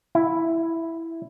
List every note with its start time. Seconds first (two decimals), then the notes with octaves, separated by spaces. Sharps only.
0.15 E4